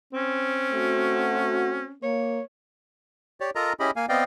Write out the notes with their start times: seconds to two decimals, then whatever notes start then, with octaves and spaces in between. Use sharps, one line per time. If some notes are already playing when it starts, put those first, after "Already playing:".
0.13 C4 C#4
0.73 A3 F#4
2.03 A#3 C#5
3.40 G4 C#5 D5
3.55 F4 A4 A#4 D#5 A#5
3.80 C#4 E4 G4 G#4 D#5 B5
3.96 A#3 F5 G#5
4.09 B3 C4 D5 D#5 F5 G5